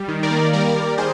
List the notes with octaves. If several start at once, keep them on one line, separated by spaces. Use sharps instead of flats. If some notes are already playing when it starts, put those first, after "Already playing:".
Already playing: G3
D#3
A#4 D5
A#3
G3 A#4 D5
G3
D#3 G#4 C5